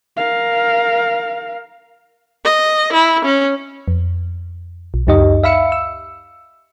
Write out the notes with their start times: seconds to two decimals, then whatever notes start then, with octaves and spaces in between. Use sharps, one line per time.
0.17 A#4 F5
2.45 D#5
2.93 E4
3.25 C#4
3.88 F2
4.94 B1
5.07 C#2 F#2 D#4 G4 D#5
5.44 E5 F5 B5 E6 C#7
5.72 E6